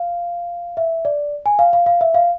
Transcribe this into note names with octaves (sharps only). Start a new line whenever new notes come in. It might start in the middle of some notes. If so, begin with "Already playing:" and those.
Already playing: F5
E5
D5
G#5
F5
F5
F5
E5
F5